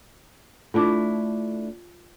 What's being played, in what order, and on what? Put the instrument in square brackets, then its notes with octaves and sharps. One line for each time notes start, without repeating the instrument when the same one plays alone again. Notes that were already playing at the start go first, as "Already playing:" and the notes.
[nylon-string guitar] A3 D4 E4 [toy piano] F4 A5 D6